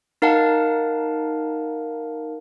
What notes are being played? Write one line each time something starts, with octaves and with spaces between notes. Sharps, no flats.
D#4 A#4 F5 F#5 A5